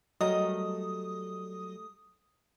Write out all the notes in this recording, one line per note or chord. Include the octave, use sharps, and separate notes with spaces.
F#3 G3 A3 A#4 D#5 D#6